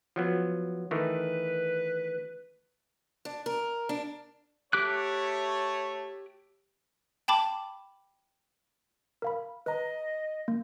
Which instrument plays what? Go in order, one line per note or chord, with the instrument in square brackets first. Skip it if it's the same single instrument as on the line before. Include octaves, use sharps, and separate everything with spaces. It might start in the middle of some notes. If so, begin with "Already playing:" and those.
[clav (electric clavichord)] F3 F#3 B3
[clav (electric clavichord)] D#3 E3 A3 [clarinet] B4
[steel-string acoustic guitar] D4
A#4
D4
[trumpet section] A3 C#5 [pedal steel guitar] G4 D6 F#6
[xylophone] G5 A5 B5 D6
[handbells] A#4 F5 B5
[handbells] B4 A#5 [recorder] D#5
[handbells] A#3